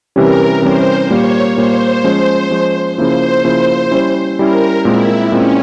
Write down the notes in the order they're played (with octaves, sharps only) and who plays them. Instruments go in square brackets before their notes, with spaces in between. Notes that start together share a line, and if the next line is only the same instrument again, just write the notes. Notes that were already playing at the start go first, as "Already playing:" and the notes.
[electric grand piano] C3 E3 G3 C#4 [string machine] A#4
[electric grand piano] C3 E3 G3 C#4 [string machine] C5
[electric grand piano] A#2 G3 A#3 [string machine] C#5
[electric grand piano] A#2 G3 A#3 [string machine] C5
[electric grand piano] F3 G#3 C#4
F3 G#3 C#4
[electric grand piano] C#3 F3 A#3 E4 [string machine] C5
[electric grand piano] C#3 F3 A#3 E4
G3 C#4 E4
[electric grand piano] G3 C#4 E4 [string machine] A#4
[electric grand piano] A#2 G#3 C4 [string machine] E4
[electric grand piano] A#2 G#3 C4 [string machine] C#4